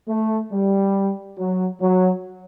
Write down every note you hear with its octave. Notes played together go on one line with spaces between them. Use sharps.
A3
G3
F#3
F#3